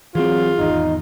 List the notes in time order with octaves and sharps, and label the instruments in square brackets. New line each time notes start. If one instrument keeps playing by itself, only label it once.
[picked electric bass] E3 C4 [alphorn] F#3 [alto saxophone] F4 [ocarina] G#4
[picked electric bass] G#1 E2 [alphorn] D#4